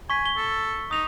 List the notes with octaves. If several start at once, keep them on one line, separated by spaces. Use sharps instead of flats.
G#5 C#6 B6
G7
A4
D#4 D#6 F7